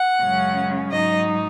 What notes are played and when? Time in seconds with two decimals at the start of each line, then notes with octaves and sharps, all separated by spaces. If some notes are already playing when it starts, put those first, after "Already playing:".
Already playing: F#5
0.23 F#2 C#3 G#3 C#4
0.91 G#2 F#3 D#4 D#5